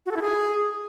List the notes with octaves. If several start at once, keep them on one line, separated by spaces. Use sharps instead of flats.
F#4
A4
E4
G#4